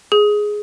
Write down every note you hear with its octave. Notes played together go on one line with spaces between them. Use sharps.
G#4